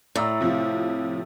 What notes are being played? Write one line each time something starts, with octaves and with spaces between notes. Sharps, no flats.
A2 D5 A#5 E6
C3 F3